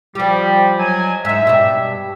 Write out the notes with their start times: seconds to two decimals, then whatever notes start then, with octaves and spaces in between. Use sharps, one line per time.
0.15 F3 G3 G4
0.79 F#3 D#5 G#5
1.25 G#2 D#4 E5
1.47 G2 B2